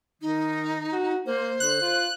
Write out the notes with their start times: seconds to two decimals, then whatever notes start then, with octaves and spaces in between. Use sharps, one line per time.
0.22 D#3 D#4
0.92 F#4
1.26 A#3 C5
1.60 D3 F#6
1.81 F4